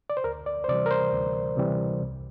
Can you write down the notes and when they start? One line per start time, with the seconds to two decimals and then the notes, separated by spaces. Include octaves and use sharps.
0.10 D5
0.17 C5
0.24 D2 A#4
0.46 D5
0.64 C5
0.68 C3 E3 G3 D5
0.86 A#4
0.91 C5
1.13 D2
1.57 C3 E3 G3
2.02 C2